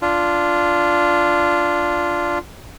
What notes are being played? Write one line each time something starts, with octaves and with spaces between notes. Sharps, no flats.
D4 F4